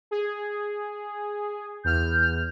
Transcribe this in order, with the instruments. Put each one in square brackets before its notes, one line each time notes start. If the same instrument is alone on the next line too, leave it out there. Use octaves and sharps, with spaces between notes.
[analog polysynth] G#4
[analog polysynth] E2 F6 [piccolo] G6